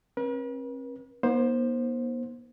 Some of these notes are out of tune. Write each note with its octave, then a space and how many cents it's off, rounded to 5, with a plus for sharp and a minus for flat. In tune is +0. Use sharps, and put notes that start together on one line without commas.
C4 +45 B4 -45
B3 -45 D#4 +0 C5 +10